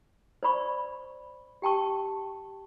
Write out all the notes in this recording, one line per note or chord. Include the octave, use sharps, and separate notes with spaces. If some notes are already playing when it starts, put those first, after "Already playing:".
C5 D5 B5 C#6
G4 G5 A5 C#6